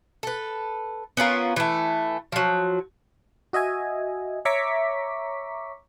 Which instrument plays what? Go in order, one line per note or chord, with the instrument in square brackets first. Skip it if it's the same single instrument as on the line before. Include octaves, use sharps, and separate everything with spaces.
[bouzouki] A4 B4
B3 C#4 F4 A#4
E3 A3
F3 F#3
[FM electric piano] F#4 D#5 E5 G#5
C#5 E5 A#5 C#6 D6 B6